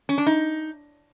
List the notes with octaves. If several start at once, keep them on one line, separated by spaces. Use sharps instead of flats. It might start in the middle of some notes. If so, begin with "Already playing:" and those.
C#4
D4
D#4